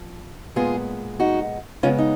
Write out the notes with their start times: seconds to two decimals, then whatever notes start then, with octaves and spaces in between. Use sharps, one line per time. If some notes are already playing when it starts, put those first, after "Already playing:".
Already playing: F3
0.56 A#2 G#3 B3 F4 G#4
1.20 D#4 F#4
1.83 C#3 G#3 B3 C#4 F4
1.98 D#4